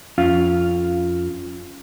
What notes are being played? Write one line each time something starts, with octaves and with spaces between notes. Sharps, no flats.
F2 C#4 F4 F5